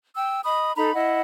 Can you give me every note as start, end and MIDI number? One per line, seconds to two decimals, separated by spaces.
0.16 0.41 79
0.16 0.41 88
0.44 0.72 75
0.44 0.72 83
0.44 0.72 87
0.76 0.93 63
0.76 0.93 69
0.76 0.93 82
0.76 0.93 83
0.93 1.21 64
0.93 1.21 75
0.93 1.21 78